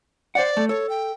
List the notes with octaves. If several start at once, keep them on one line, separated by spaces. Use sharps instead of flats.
C5 D5 F#5
A3
A4 C#5
G5